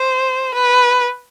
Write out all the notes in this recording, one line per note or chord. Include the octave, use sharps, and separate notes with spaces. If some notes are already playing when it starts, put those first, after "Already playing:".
Already playing: C5
B4